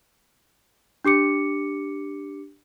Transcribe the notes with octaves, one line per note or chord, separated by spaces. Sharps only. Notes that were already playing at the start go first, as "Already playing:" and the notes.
D4 G4 D6 C#7